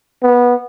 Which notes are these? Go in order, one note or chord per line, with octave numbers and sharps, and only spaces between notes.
B3